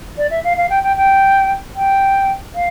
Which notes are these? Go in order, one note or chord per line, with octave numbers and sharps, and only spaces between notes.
D5
E5
F5
F5
G5
G5
G5
G5
F5